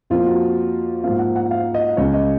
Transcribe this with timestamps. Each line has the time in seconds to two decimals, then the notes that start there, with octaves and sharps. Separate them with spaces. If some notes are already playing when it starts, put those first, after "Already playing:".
0.10 F2 F3 A#3 F4
0.26 F#4
1.03 G#2 F3 A#3 F5
1.19 F#5
1.36 F#5
1.51 F5
1.74 D#5
1.97 C#2 C#3 G#3 C#5
2.14 D#5